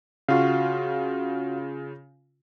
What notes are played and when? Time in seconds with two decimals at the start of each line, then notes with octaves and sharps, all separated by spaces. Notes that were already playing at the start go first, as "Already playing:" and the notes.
0.28 C#3 F4 F#4 F5